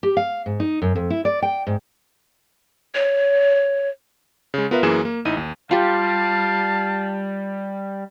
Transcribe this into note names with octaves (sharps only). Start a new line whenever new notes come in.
G4
F5
G#2
D#4
F#2
F2
E4
D5
G5
G#2
C#5
C#3 G#3
B3 F4 A#4 B4 E5
F#2 E3 A#3 G#4 E7
A#3
A1 D#4 E4 D#7
D#2
G3 F4 G4 F5 A5